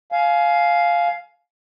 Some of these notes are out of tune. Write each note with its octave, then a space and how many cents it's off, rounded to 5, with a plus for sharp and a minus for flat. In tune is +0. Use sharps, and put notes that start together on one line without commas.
F5 +0 G#5 +25